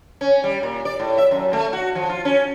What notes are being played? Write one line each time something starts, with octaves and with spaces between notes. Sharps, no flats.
C#4
G3
A#2
D5
A2
E5
F#2
A3
F#4
F3
F4
C#4